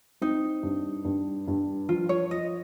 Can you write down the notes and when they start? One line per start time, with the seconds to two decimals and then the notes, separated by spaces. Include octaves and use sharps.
0.21 C4 D#4
0.63 G2
1.05 G2
1.48 G2
1.89 F3 F4
2.09 C#5
2.31 F4 D#5